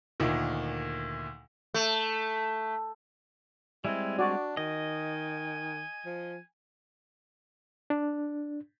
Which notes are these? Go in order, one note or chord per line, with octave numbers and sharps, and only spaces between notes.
D2 A#2 D#3
A3
G3 G#3 C4 E4 G#5
D4 F#4 D5
D#3 D#5 G#5
F3
D4